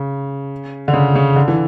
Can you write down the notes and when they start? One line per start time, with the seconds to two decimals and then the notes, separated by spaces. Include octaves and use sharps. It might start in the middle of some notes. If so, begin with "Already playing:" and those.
Already playing: C#3
0.88 D3
0.94 C#3
1.16 C#3
1.36 D3
1.48 E3